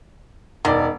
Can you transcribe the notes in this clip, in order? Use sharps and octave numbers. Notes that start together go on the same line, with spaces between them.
E1 D#3 D5